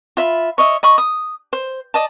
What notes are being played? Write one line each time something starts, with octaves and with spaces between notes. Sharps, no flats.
F4 E5 B5
C#5 D#5 E5
D#5 B5 C#6
D#6
C5
D5 D#5 A5